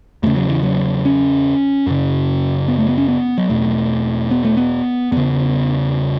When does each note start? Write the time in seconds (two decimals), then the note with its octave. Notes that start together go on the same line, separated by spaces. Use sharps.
0.23 E2 C#3 A3
0.36 F#3
0.49 E3
0.63 F#3
1.05 C#4
1.87 F#2 C#3
2.68 B3
2.78 A3
2.89 B3
2.98 C#4
3.08 B3
3.38 F#3
3.49 E2 B2 A3
4.31 B3
4.44 A3
4.57 B3
5.12 E2 C#3 B3